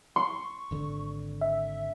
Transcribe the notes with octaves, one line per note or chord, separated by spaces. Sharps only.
C6 C#6
G#1 D3
E5